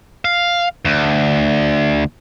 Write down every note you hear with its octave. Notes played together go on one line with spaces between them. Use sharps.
F5
D2